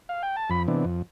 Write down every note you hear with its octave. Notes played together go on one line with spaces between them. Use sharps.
F5
G5
A5
F2 B5
C3 E3 B3 D4
F2